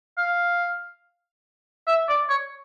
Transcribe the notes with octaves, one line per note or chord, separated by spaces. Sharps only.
F5
E5
D5
C#5